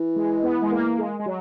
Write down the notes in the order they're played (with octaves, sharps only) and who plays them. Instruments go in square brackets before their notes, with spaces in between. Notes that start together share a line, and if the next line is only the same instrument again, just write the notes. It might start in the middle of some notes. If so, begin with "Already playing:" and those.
Already playing: [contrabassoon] E3
[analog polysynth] G#3
B3
G#3
A#3
G#3
G#3
F#3